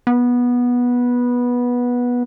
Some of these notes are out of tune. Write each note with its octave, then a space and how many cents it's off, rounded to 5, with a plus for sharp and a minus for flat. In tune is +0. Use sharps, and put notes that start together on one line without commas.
B3 -15